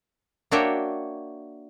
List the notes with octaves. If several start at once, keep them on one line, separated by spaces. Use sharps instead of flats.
A#3 D4 F#4 C#5 E5 G5